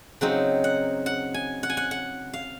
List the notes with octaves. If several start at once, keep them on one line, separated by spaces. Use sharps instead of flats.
C#3 F#3 C4 D#4 F#5
F#5
F#5
G#5
F#5
G#5
F#5
F#5
F5